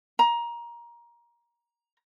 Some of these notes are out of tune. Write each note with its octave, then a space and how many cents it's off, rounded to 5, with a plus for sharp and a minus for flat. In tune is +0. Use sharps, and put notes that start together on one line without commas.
A#5 +20